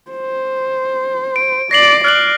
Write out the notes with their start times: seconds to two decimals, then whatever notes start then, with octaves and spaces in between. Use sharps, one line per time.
0.11 C5
1.36 D7
1.71 D5 A#6 C7 F#7
2.04 D5 F6 F#6 F#7